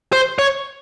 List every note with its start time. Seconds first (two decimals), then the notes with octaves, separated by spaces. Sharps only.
0.13 C5
0.39 C#5